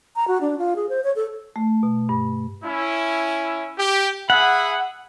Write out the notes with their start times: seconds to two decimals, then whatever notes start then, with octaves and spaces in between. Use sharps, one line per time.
0.16 A#5
0.28 F#4
0.41 D4
0.59 F4
0.76 G#4
0.89 C5
1.04 C#5
1.16 A4
1.56 A3
1.83 B2
2.09 G2
2.65 C#4 E4
3.79 G4
4.30 G#4 E5 F#5 B5